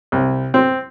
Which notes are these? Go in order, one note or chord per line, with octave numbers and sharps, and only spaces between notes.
C2
C4